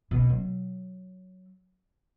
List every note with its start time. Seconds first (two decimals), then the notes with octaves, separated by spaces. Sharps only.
0.11 B2
0.29 F#3